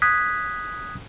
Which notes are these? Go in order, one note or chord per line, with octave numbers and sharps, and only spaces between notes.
D#6 F#6 G#6 B6